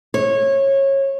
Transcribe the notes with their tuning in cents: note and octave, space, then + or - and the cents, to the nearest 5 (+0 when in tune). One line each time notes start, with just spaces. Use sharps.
C#5 -20